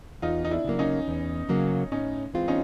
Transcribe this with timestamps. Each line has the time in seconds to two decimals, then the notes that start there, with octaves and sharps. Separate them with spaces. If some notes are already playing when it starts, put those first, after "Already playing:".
0.22 E2 D#4 F4
0.45 D#4
0.51 D4 E4
0.65 C#3 F#3 A#3
0.79 C#4 D#4
1.08 E2
1.49 C#3 F#3 A#3
1.91 A2 C#4 D#4
2.34 E3 G#3 C4 F4
2.48 C#4 D#4